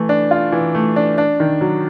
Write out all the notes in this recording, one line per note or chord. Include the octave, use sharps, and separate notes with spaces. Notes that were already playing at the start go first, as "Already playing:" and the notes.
Already playing: E3 A3
D4
F4
E3
A3
D4
D4
D#3
F#3